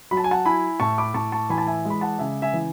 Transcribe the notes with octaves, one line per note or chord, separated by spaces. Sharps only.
F#3 B5
A5
G#5
F#5 A5
E4 G#5 B5
A2 A5 C#6
B5 D6
A2 A5 C#6
A5 C#6
E3 G#5 B5
A5
E5 G#5
G#3
B5
F#5 A5
C#3 E5 G#5
E5 G#5
E3